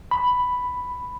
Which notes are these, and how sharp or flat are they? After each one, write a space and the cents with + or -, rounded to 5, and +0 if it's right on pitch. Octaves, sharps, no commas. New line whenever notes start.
B5 +5